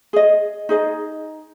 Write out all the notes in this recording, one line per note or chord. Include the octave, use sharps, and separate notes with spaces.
G#4 D#5
D#4 G#4 D#5